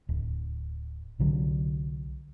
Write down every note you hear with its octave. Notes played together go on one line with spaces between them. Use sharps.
D1
C2 D3 F#3